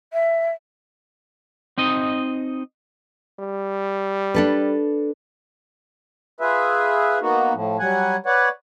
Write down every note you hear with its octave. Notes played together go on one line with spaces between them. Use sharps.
E5
C4 D#4 D#5
G3
D4 A4 B4
F4 G#4 B4 E5
A#3 B3 D#4 F#4
A2 F3
F#3 G3 F#5 G#5
B4 C#5 D5 F#5